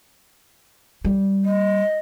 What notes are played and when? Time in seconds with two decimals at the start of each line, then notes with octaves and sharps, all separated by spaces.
1.05 G3
1.45 D#5